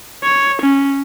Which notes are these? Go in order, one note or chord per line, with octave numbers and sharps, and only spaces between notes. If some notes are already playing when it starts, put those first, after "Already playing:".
C#5
C#4